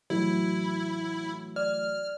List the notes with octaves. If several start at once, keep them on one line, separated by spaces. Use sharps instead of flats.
A2 E3 F#3 E4
D5 F6